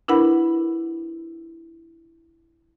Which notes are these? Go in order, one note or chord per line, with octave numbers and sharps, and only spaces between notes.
D4 E4 A#4 B4 F#5 B5